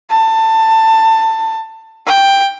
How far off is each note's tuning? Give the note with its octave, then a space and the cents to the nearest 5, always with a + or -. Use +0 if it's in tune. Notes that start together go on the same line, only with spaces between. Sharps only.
A5 +20
G5 +10